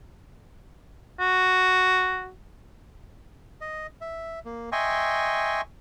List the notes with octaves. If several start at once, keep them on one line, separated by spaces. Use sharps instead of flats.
F#4
D#5
E5
A#3
D#5 E5 G5 G#5 C6 C#6